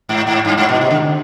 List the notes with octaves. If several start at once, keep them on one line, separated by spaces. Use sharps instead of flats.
G#2
G#2
G2
G#2
B2
C3
D3